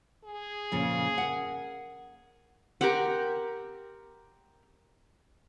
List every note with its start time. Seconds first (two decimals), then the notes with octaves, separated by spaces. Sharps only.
0.25 G#4
0.72 F2 A#2 C#3
1.18 A#4 F#5
2.81 C4 G4 A#4 F#5